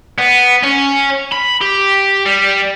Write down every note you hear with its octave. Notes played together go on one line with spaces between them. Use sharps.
B3
C#4
B5
G4
G3